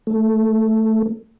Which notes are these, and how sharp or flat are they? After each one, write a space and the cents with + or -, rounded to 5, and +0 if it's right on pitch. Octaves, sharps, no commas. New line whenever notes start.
A3 +5